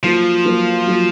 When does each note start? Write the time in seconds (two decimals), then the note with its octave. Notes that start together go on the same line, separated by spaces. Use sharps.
0.03 F3 F#3 A#3 F4
0.45 F#3 A#3 F4
0.87 F#3 A#3 F4